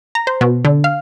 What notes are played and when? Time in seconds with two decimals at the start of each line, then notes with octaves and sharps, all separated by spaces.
0.15 A#5
0.27 C5
0.41 B2
0.65 D3
0.84 F5